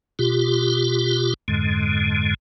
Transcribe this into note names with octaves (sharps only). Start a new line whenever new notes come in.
B2 F4 G4
F2 G#2 D3 G#3